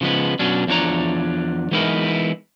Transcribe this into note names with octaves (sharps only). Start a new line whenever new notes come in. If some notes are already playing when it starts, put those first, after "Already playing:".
C#3 F3 G#3 B3
B2 F#3 C#4 D4
E2 F3 D4 C#5 A#5
E3 G#3 B3 D#4 E4 A#4